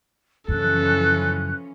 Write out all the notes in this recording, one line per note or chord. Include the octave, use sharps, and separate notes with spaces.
F#2 C#3 E3 F3 C#4 A4 F#6